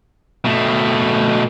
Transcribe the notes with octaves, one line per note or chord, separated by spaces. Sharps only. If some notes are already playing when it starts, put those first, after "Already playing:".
B2 A3